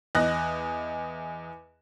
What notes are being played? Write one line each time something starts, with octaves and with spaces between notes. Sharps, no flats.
E2 D#5 F#6 A#6